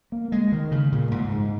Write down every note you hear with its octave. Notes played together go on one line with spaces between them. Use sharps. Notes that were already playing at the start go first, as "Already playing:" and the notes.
A#3
G#3
D#3
C#3
A#2
G#2
G#2